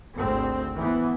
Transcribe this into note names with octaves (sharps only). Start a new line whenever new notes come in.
G#1 D2 C4
E3 B3